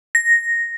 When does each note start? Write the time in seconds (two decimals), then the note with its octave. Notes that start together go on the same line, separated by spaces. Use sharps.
0.15 A#6